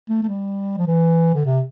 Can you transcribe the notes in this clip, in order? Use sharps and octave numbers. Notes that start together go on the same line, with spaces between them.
A3
A3
G3
F3
E3
D3
C3